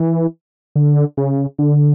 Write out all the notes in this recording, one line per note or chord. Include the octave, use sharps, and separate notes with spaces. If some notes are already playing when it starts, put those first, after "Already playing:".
Already playing: E3
D3
C#3
D3